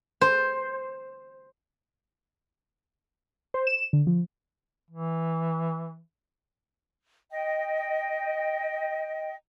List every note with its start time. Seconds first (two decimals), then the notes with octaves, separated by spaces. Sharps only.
0.21 C5
3.54 C5
3.67 E7
3.93 D3
4.07 F3
4.91 E3
7.31 D#5 G5